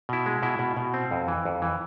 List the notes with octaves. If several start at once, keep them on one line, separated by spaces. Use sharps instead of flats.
B2 E4
G#3
B2 E4
B2
B2
C4
F2
E3
F2
E3